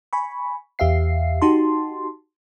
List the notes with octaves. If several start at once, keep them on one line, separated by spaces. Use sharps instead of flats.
G#5 B5 C#6
E2 G4 E5 F5 C7
D#4 F#4 G4 A5 C6